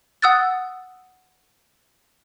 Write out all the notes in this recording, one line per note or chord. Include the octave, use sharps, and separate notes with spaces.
F#5 D#6 E6 F#6 A6